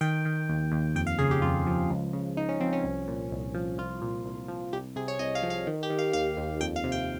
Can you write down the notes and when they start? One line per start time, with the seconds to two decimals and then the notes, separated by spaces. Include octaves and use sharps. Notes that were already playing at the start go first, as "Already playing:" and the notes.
0.01 D#3 G5
0.25 D#3
0.49 D#2
0.72 D#2
0.95 F2 G5
1.07 F5
1.18 C#3 G#4
1.31 G4
1.42 F2 F4
1.67 F3
1.90 C#2
2.13 C#3
2.36 C#2 D#4
2.49 C#4
2.61 F3 C4
2.73 C#4
2.84 C2
3.08 A#2
3.31 C2
3.54 F3
3.78 C2 F4
4.01 A#2
4.25 C2
4.48 F3
4.73 C2 G4
4.96 C3 G#4
5.08 C#5
5.19 C2 D#5
5.35 F5
5.43 F3
5.50 F5
5.67 D#3
5.83 G4
5.90 D#3
5.99 F5
6.13 D#2 F5
6.37 D#2
6.61 F2 G5
6.76 F5
6.84 C3
6.92 G5